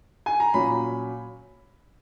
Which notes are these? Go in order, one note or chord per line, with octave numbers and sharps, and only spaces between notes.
G#5
A#5
A#2 F#3 C#4 B5